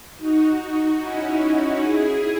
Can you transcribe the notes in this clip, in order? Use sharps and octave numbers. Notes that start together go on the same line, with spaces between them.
D#4 F#4
C#4 E4
E4 G#4